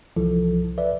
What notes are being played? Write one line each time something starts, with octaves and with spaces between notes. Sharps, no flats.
C2 E3 F3 E4 A4
B4 D5 E5